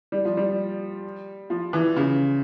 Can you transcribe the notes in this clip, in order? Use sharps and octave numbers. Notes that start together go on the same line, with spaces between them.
G3
F3
G3
F3
E3
C#3